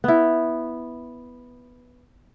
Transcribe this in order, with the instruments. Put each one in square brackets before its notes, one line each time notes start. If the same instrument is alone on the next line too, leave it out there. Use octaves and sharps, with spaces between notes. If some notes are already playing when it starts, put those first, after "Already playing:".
[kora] B3 E4